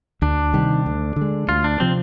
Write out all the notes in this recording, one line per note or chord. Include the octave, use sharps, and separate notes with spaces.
D2 D4
C3 D#3 G3
D2
D3
G#3
D2 F4
D4
C3 F3 C4